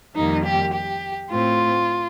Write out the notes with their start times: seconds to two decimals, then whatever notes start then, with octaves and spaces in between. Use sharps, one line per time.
0.15 F2 D#3 G3 A#3 D#4
0.44 G4
0.73 G4
1.29 A2 A3 C4 F4